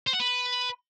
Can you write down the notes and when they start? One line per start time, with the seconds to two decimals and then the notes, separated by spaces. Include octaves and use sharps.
0.07 C5
0.13 F#5
0.20 B4